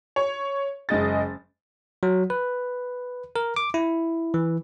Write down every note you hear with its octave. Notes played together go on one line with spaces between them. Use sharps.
C#5
F#1 G#3 D#5 A6
F#3
B4
A#4
D6
E4
E3